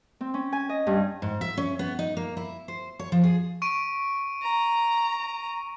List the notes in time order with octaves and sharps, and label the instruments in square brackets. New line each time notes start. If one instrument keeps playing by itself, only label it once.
[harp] C4
C#4
G#5
D#5
G2
[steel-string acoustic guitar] G#2
E5
C#4
B3
D#4
A#3
E4
C5
C#5
F3
G#4
[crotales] C#6 D7 D#7
[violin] A#5